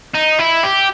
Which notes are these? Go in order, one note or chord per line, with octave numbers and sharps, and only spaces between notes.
D#4
E4
G4